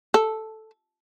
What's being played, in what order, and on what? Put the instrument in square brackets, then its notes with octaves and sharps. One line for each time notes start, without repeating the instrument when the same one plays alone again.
[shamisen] A4